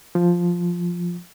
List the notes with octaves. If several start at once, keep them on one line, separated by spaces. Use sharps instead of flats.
F3